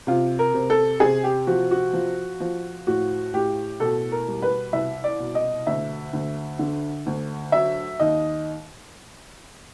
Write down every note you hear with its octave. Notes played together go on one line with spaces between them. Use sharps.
C3 F4
A#4
C3
A4
C3 G#4
G4
F3 F#4
F#4
F3
F3
A2 F#4
A2 G4
B2 A4
A#4
G3
B4
C2 E5
D5
B2
D#5
D2 E5
D2
D3
D2
F#3 E5
D#2 D#5